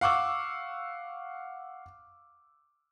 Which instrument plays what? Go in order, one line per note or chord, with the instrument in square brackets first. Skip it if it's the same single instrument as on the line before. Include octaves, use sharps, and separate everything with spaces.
[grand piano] F5 F#5 C#6 D6 E6